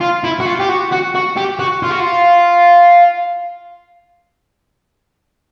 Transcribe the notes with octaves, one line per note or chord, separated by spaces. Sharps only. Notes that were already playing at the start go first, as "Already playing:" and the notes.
F4
E4
F#4
F4
G4
F#4
F#4
F#4
G4
F#4
F4
F#4
F4